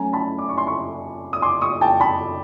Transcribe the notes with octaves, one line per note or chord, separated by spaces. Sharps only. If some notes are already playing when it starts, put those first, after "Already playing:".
Already playing: F#3 A3 C#4 G#5 A#5
A5 B5
D6
C#6
C6
B5 C#6
D#6
C6 D6
C#6 D#6
G5 A5
A5 B5